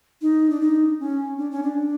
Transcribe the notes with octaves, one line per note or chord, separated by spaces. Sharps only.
D#4
D4
D#4
C#4
D4
C#4
D4